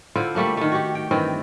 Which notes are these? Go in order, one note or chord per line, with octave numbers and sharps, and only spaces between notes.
D3 E4 F4 C5
G3 A3 A#3 D4
D#3 A3
F#4 G4
G5
G2 D#3 E3 C4